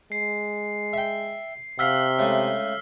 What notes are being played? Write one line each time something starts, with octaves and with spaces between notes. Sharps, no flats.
G#3 C7
E5 G5
C3 F5 F#5 E6 F6 B6
C#3 G#3 A3